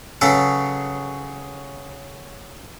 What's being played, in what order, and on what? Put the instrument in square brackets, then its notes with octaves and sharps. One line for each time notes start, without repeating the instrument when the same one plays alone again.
[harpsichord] C#3 F#3 C#4 G#4 A4 B4